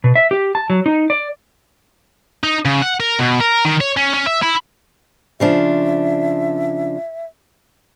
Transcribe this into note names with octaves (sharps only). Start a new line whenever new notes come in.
B2
E5
G4
A5
F#3
D#4
D5
D#4
C#3
F#5
A#4
B2
A#4
D#3
C#5
C#4
C#4
E5
E4
C#3 F3 D4 E5